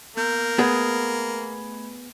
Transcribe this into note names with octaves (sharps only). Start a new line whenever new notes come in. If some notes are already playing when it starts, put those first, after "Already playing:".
A#3 B3 G6
A3 B3 G#4 B5 G#6